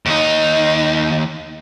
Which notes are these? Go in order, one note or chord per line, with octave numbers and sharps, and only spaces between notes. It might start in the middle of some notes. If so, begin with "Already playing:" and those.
D#2 D#4